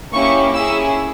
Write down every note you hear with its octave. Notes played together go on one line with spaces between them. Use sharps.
A#3 C#4 E4 G4 C#6
C#4 E4 G#4 E6